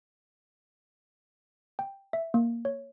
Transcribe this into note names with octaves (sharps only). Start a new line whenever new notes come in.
G5
E5
A#3
C#5